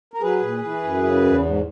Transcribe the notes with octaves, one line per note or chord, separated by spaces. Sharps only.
A#4
F#3 G#4 B4
A#2
E3
F#2
C#3
E2
G#2